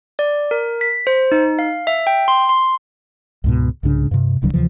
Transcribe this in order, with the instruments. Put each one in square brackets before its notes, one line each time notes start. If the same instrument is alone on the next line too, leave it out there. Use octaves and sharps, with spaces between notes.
[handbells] D5
A#4
B6
C5
D#4
F5
E5
G5
C6
C6
[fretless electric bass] C#2 G#2 B2
C2 G#2 C#3 D4
G2 C3
D1 C2 D3 F#3
D2 C3 E3 F3